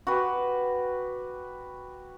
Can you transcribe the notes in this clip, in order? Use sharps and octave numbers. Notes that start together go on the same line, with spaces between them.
F#4 G4 B4